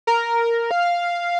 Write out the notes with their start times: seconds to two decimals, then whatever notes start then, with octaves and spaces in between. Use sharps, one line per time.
0.07 A#4
0.71 F5